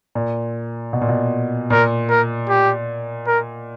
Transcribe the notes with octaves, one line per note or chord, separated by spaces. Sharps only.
A#2
B2
A#2
B2
A#2 A#4
A#4
G4
A#4